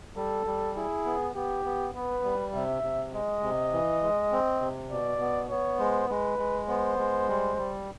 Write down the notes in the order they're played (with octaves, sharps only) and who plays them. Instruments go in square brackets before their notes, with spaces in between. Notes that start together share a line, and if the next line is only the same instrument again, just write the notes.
[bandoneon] G3 [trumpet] A4
[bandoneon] G3
[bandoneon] E4 [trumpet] G#4
[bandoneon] B3
[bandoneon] B3 [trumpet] G4
[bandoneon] B3
[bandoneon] B3 [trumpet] B4
[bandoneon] G3
[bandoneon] C3 [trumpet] E5
[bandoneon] C3
[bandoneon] G#3 [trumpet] D#5
[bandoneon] C3
E3
G#3
C4
C3
[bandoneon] B2 [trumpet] D5
[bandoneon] B3
[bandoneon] B3 [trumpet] C#5
[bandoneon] G#3 [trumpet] C5
[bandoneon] G#3 [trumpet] B4
[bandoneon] G#3
[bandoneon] B3 [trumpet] C5
[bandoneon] G#3
G3
G3